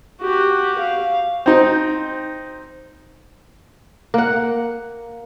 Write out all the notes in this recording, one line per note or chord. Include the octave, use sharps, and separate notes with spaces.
F#4 G4
F5
C4 D#4
A#3 F#5